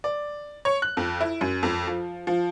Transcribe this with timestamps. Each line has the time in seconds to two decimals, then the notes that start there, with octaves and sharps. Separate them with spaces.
0.04 D5
0.65 C#5
0.82 F#6
0.97 F2
1.21 E4
1.41 F#2
1.63 F2
1.87 F3
2.27 F3